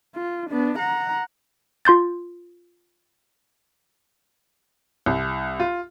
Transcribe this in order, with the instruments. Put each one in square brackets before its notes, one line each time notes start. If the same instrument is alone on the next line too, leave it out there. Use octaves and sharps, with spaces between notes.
[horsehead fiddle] F4
B3 D4
F#5 A#5
[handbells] F4 C6 G6 A6
[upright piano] C2
F4